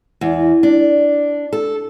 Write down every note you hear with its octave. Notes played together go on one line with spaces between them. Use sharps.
E2
D4
A4